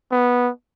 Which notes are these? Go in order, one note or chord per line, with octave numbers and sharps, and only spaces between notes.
B3